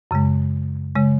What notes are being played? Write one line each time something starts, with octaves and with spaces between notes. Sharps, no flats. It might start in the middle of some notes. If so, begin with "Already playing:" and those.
F#2 C#3 G#3
C#3 G#3